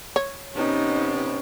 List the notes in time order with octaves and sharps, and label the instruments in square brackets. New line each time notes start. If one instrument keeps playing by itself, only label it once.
[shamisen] C#5
[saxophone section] C3 B3 [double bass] C#4 [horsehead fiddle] D#4